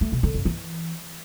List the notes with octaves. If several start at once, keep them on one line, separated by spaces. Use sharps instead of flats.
A3
B2
D3
F#2
E3